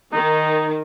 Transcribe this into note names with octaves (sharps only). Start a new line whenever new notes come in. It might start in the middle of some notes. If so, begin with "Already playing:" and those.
D#3 D#4